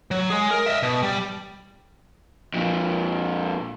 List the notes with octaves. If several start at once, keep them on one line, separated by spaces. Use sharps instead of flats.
F#3
G#3 G#4
A#4
D#5 E5
B2
G3
F2 A#2